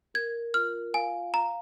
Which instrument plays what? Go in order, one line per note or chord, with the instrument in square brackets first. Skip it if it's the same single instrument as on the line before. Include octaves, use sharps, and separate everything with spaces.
[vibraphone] A#4 [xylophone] G#6
[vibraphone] F4 [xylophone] F6
[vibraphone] F5 [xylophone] G#5
[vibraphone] F5 [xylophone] A#5